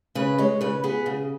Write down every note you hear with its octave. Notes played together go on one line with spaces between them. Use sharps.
C#3 B4
G#3 C#5
C#3 B4
B3 G#4
C#3